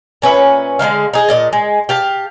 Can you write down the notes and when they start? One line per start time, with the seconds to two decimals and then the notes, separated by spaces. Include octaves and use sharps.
0.22 A#2 C#4 B4 E5
0.79 D3 G#3 D#4 F5
1.13 D#4 G#4
1.29 A#2 D#5 A5
1.53 G#3
1.89 G4 F5 A5